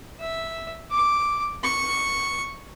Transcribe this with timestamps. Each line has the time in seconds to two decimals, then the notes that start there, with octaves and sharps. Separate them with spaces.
0.21 E5
0.90 D6
1.64 C#6